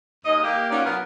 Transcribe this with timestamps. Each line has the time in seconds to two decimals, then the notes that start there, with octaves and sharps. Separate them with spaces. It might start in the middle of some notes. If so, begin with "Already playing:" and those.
0.24 D#2 D#5
0.43 A#3 G4
0.70 C#4 D#4 F4 F#4 A#4 D5
0.84 B2 F#3 B3 A#4 B4